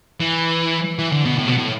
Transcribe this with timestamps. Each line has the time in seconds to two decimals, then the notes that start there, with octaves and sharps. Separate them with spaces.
0.20 E3
0.99 E3
1.12 D3
1.25 B2
1.39 A2
1.48 B2
1.58 A2